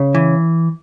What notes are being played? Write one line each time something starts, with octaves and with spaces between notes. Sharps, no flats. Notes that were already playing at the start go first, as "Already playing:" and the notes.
Already playing: C#3
E3